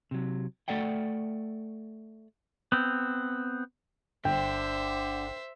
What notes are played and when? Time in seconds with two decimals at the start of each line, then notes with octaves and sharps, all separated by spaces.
0.11 C3 F#3
0.68 A3 A4 D5 F#5 G5
2.72 B3 C4
4.25 G1 D3 C5 E5 G5